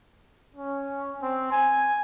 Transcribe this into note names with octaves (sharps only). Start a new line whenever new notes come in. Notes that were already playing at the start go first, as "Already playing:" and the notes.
C#4
C4
G#5